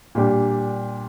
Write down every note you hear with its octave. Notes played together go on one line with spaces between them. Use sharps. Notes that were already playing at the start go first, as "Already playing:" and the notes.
A#2 G3 D4 G4